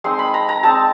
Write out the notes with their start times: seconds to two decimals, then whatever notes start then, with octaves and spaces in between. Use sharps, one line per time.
0.04 G#3 C4 D#4 C6
0.19 B5
0.34 A#5
0.49 A#5
0.63 G#3 C4 D#4 A5